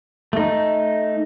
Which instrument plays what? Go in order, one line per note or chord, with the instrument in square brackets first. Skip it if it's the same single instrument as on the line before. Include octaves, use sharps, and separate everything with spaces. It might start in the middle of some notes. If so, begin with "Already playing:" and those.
[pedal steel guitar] A3 D#4